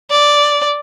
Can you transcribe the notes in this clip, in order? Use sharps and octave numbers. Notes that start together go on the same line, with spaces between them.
D5